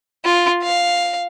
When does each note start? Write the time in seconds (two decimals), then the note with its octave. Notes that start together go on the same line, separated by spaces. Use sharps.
0.25 F4
0.63 F5